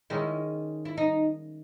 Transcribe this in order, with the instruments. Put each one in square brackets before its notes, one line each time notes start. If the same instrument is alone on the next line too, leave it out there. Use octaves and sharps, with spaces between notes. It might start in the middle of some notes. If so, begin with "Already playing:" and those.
[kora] D#3 G#3 C#4 [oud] E4
[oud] E4
D#4